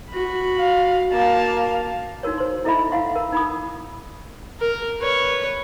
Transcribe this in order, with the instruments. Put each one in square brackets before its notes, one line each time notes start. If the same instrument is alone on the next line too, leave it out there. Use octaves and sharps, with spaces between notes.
[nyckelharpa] F#4 B5
[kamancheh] F5
[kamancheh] A#3 F5 [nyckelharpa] A5
[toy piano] D#4 F#4 A#4 C#5
C5 C6
D#4 E4 A4 D#5 E5 B5
E4 F5 F#5 C6
A#4
D#4 B5 D#6
[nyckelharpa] A#4
B4 C#5